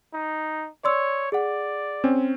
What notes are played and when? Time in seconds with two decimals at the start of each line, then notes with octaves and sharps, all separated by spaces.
0.13 D#4
0.84 C#5 D5 C6 E6
1.32 G#4 D5 F#5
2.04 C4 C#4